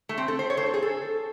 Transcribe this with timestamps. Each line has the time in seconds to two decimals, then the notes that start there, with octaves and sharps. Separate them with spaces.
0.09 A3
0.18 C4
0.28 A4
0.39 C5
0.50 C#5
0.57 C5
0.66 A4
0.74 G#4
0.82 A4